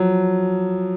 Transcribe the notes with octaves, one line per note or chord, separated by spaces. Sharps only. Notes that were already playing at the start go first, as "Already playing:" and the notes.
Already playing: F3 F#3